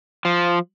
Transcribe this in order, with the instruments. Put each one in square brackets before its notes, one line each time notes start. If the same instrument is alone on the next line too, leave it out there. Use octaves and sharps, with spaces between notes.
[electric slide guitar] F3